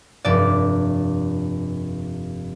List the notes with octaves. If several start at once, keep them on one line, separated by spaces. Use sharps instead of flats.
F1 G2 D5